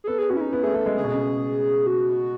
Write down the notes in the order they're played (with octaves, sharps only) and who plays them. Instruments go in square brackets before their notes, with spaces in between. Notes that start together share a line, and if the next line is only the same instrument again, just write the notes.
[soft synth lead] G#4
[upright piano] B3 [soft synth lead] A4
[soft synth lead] G#4
[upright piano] C#4 [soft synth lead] F#4
[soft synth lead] E4
D#4
[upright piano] B3 [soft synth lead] E4
[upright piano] A3 [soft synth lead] G#4
[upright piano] A3 [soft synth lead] A4
[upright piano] G#3
[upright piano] C#3 [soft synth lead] G#4
[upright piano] B2
C#3
[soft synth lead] F#4